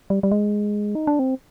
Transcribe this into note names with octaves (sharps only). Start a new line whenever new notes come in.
G3
G3
G#3
D#4
D4
C4